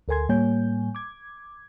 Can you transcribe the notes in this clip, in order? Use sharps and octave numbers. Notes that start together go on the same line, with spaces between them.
D2 A4 A#4 G#5 C6 G#6
A2 G3 A#3 C#5 G#5 G6
D6 G#6